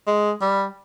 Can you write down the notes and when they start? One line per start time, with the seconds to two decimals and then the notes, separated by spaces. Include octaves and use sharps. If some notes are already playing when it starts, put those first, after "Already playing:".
0.07 G#3
0.42 G3